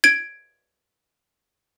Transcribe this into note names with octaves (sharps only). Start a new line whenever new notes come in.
G#6 D7